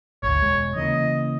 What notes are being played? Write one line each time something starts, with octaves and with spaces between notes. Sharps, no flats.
G#1 D2 C#5
E1 G#3
C#3 E3 A#3 D#5